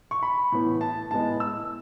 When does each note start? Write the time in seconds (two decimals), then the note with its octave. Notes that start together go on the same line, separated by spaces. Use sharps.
0.11 C#6
0.23 B5
0.52 A2 E3 B3
0.81 A5
1.11 A2 G#3 B3 A5
1.40 E6